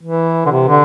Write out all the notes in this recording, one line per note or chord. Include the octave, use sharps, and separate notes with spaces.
E3
D3
C3
D3